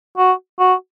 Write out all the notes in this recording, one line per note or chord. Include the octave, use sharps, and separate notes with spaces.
F#4
F#4